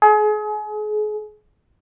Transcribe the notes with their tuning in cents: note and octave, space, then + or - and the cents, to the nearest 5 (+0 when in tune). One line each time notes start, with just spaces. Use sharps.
G#4 +35